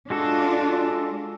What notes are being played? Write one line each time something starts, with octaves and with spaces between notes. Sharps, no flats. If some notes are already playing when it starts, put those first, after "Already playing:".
G#3 D4 F4 F#4 A4